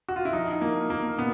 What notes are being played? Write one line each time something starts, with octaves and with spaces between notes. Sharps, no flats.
F#4
F4
E4
F3 D#4
F3 A#3
F3 A#3
A#2 B3